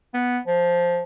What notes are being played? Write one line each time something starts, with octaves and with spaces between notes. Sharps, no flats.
B3
F3